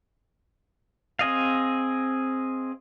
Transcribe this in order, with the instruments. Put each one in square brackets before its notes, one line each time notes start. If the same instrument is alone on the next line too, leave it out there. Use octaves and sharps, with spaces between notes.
[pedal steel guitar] C4 G#4 D#5 F5